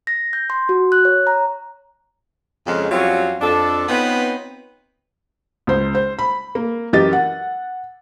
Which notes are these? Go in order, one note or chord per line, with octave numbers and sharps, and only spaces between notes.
A#6
G6
C6
F#4
F#6
C#5
A#5
F2 C#3 G#3
F2 F#3 G3 C4 C#4 F4
F2 D4 A4
B3 C4 D#4 F4 B4 C#5
C#2 C5
C5
B5
A#3
F#2 E3 G4 A#4 D#5 A6
F#5